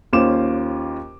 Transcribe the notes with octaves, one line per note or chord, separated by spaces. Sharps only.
D#2 C#4 F4 C5 D6 E7